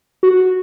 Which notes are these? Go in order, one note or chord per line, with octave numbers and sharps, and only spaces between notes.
F#4